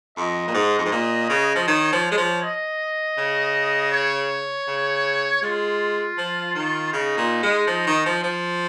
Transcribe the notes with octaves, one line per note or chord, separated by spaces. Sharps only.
F2 D#5
A#2
G#2
F2
G#2
A#2
C#3
F3
D#3 C#5
F3
C#5
G#3
F3
D#5
C#3
C#5
C#3
G#3 F4
F3
D#3
C#3 D#4
A#2
G#3
F3
D#3
F3
F3